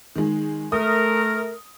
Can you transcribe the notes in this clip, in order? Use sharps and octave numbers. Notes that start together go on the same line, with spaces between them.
D#3 G#3
A3 A#4 D#6